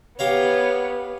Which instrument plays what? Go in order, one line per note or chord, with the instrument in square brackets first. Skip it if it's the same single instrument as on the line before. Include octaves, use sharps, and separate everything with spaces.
[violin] B3 [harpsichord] G4 F5 A#5 [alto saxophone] C#5